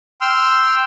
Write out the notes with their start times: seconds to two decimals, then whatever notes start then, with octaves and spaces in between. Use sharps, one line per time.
0.21 G5 C6 E6 F6